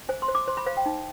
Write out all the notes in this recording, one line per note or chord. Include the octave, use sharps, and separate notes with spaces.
C5 G#5
C6
C5
D6
C5 C6
B5
C5 F5
G5
D#4